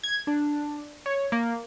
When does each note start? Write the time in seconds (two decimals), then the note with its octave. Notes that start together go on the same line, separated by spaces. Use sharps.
0.03 G#6
0.27 D4
1.06 C#5
1.32 A#3